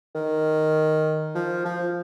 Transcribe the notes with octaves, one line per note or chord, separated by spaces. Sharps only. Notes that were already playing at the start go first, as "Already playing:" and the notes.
D#3
F3
F3